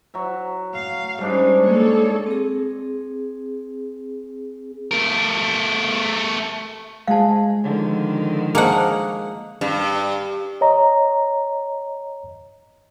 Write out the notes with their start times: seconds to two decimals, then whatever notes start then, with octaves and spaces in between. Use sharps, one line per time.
0.14 F#3 E5
0.74 F5
1.21 G#2 G3 C#4 D4 B5
1.66 A#3 A4 C#5
2.27 C4 G#4
4.91 A3 A#4
7.08 G#3 G#4 F5 A5
7.63 D3 D#3 F3
8.55 A#3 G#4 C5 D#5 F#5 A5 C#6 D6
9.61 G2
10.61 C#5 D#5 A#5